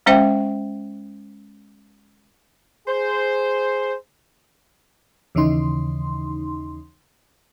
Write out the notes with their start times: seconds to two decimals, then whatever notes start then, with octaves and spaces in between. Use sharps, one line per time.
0.06 G#3 C#4 C5 E5 G5
2.88 G#4 C5
5.35 D#2 C#3 E3 D#4 C6